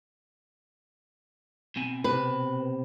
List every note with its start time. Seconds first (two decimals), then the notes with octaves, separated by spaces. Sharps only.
1.76 B2 C4 G#5
2.04 C3 B4